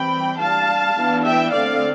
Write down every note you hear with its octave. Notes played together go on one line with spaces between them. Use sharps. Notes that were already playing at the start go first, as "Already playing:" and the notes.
Already playing: E3 G3 C4 G5 B5
G3 D4 F5 A5
E3 B3 D4
E5 G5
D3 A3 C4 D5 F5